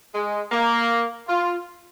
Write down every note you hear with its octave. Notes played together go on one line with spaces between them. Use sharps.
G#3
A#3
F4